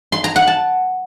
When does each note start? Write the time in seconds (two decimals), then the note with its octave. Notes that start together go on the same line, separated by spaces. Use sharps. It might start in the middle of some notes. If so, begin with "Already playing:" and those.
0.12 C6
0.24 A#5
0.36 F#5
0.47 A5